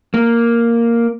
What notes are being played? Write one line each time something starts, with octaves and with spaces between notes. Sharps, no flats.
A#3